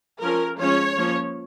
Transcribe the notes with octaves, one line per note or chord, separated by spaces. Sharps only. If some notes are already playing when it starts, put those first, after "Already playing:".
F3 C#4 A#4
F3 G#3 C#4 C#5
F3 A#3 C#4